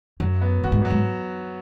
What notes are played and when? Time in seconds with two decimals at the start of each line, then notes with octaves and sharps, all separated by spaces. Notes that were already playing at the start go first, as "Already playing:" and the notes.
0.20 F#2 F#3
0.41 B3
0.64 F#2 F#4
0.72 G#2
0.81 F#2
0.85 F#3
0.90 G#2